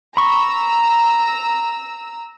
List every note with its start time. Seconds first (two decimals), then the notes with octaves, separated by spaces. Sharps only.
0.17 A#5 B5 C#6 E6